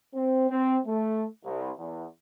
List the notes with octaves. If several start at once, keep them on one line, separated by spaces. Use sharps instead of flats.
C4
C4
A3
C2
E2